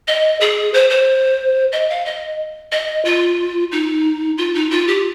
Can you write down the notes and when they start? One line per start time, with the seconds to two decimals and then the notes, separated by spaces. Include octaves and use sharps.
0.08 D#5
0.41 G#4
0.74 C5
0.90 C5
1.72 D#5
1.90 F5
2.05 D#5
2.72 D#5
3.05 F4
3.72 D#4
4.38 F4
4.55 D#4
4.71 F4
4.88 G4